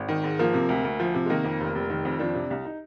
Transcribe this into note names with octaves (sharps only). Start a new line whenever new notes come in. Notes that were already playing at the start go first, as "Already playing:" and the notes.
Already playing: G#1
D#3
G#2
F3 A#3
C3
D2
D2
F3
C3
G#3
D#3 A#3
F2
F1
F1
D#3
F2
F3 D4
C3
C2
D#4